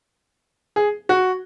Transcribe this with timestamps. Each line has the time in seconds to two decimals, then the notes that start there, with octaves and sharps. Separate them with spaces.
0.76 G#4
1.09 F#4